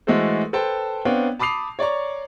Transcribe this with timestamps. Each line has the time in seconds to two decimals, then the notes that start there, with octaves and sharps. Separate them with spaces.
0.07 E3 G#3 A3 F#4 A4 C5
0.53 A4 B4 C5 G5 A5
1.05 B3 C4 D4 C#5 F5 G5
1.39 A5 B5 D6 D#6 C7 F7
1.79 C#5 D5 A#5 C#6